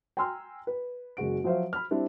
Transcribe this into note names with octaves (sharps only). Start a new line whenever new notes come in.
G5 G#5 A#5 C6 E6 F6
B4
F#1 G#3 F#4 D7
F3 F#3 F#4 C5 E5 F5
B5 F6
G3 C4 D4 E4